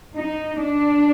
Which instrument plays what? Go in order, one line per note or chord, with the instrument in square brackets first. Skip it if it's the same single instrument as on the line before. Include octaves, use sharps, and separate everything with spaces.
[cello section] D#4
D4